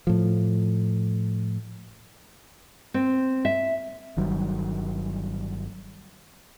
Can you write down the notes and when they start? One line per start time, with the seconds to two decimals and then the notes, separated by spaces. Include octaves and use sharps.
0.07 A2 F3
2.94 C4
3.45 E5
4.17 G1 D#3 F#3 G3